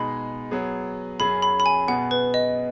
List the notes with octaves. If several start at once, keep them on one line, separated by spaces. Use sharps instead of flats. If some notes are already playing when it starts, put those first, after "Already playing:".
Already playing: B2 G#3 D#4 G#4 B5
F#3 B3 G#4
F#2 F#3 C#4 G#4 B5
B5
B5
G#5
B2 B3 G#4 F#5
B4
D#5